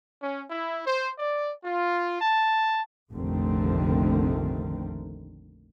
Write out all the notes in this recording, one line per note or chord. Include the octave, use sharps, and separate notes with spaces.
C#4
E4
C5
D5
F4
A5
F1 A#1 D3 D#3 A3 C4